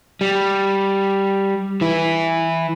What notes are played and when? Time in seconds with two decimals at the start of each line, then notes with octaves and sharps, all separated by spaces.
0.21 G3
1.81 E3 E4